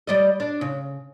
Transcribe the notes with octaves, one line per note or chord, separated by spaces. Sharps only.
G3 D5 D#5
D4
C#3